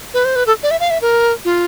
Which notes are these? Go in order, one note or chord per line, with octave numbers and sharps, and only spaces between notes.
B4
C5
B4
A4
D5
E5
F5
E5
A#4
F4